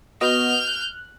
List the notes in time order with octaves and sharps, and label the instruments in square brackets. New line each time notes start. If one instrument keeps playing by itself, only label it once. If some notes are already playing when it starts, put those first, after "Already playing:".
[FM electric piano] B3 F#4 D#5 [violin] F6 G6
[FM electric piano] F#6